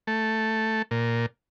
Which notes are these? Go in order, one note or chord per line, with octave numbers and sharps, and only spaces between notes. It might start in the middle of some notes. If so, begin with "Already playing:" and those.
A3
A#2